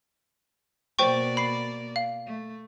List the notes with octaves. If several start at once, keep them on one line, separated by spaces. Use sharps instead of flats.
B2 A#3 C5 D5 G5 C#6
B5 C7
F5
A3